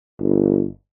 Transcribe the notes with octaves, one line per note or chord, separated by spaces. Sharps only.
G1